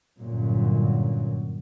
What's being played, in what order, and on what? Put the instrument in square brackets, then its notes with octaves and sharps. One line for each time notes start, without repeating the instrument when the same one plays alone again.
[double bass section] G1 F#2 A#2 F#3